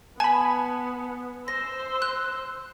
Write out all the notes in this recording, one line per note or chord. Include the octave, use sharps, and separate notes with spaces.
B3 G#5 A5 B5
C5 E6 A#6
F#6